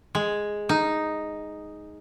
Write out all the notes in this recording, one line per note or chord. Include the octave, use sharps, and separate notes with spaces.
G#3
D#4